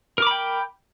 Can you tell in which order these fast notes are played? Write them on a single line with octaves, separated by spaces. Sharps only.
A#4 D6 B5 G5